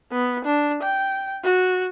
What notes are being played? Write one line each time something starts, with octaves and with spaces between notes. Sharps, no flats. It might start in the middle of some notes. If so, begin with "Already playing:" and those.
B3
D4
G5
F#4